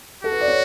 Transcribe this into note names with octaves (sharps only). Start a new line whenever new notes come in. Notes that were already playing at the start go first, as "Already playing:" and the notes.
F#4 A4
B4
D5
C#5